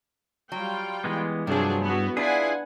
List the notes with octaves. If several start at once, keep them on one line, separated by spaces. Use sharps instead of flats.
F#3 G3 F4 G5
E3 G#3 B3
G2 C3 F3 F#3 D4 G#4
B3 E4 F#4
D4 E4 F4 G#4 B4 F#5 G#5